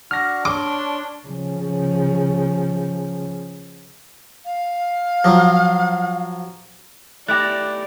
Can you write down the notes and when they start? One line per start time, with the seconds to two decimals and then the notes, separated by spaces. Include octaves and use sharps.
0.11 D4 F#4 F6 A#6
0.45 D4 C#5 C6 D6
1.27 C#3 F3
4.45 F5
5.24 F3 F#3
7.28 A3 E4 G4 D5 F#6 A#6